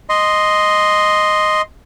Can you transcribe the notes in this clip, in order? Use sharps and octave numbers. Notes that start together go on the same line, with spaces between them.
D#5 C6